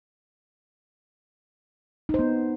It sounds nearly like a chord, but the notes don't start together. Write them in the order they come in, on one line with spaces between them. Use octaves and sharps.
D#4 C5 B3